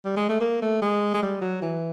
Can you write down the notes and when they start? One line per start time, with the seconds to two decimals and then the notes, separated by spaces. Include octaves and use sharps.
0.05 G3
0.17 G#3
0.29 A3
0.41 A#3
0.62 A3
0.82 G#3
1.14 G#3
1.23 G3
1.41 F#3
1.62 E3